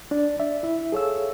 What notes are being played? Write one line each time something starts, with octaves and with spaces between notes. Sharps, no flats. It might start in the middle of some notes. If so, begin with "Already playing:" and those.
D4 D5
D5 E5
E4 E5
G#4 A4 C#5 F5 E6